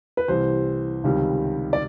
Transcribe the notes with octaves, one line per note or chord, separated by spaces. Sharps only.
B4
C2 C3 E3 G3 C5
C#2 C3 D#3 G3
D5